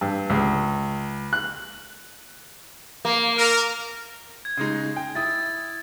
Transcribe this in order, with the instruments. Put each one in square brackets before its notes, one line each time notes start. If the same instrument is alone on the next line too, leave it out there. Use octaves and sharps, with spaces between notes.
[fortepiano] G2
C#2
F#6
[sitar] A#3
[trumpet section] A#4
[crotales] G#6
[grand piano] C#3 G#3 D#4
G5
[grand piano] E4 D#6 [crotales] A6